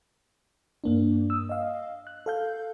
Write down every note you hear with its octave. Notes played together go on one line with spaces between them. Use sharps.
G2 A#3 D4
D#6 E6
D#5 F5
F#6
A4 F5 G6